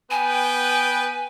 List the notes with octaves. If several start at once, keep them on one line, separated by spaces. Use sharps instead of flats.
B3 B4 G5 G#5